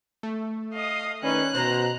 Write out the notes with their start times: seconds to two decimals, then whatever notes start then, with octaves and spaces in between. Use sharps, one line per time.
0.23 A3
0.74 D#5 F5 D#6
1.23 D#3 C#4 D#4 B4 D5 F#6
1.55 B2 C5 A#5